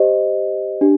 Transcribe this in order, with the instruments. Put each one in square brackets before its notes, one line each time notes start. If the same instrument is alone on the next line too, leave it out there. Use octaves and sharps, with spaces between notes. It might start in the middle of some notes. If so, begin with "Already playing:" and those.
Already playing: [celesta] G4 C5 D#5
D4 G4